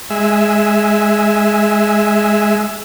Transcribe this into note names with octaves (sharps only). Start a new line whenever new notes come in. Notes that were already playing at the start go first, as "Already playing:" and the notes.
G#3 E5